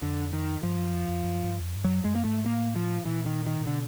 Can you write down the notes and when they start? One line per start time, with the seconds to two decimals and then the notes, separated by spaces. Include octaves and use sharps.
0.02 F2 D3
0.33 D#3
0.63 G2 F3
0.78 F#2
0.94 F2
1.08 F2
1.24 F#2
1.44 G2
1.60 E2
1.64 F2
1.76 G2
1.84 F#2 F#3
2.05 F#2 G#3
2.15 A#3
2.25 G#2 A3
2.45 A2 A#3
2.76 F3
3.05 A#2 E3
3.26 D#3
3.47 D#3
3.60 A#2
3.66 B2 D3